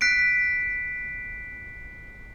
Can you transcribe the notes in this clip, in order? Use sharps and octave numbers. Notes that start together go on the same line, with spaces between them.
F#6 B6 C7 D7